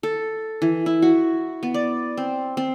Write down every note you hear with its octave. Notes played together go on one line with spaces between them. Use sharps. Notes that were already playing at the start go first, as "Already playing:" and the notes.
A4
E3
E4
F#4
B3
D5
C4
C4